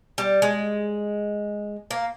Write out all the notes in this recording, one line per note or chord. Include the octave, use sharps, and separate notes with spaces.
G3
G#3
A#3